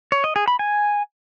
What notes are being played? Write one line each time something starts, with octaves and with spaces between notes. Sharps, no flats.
C#5
D#5
G#4
B5
G#5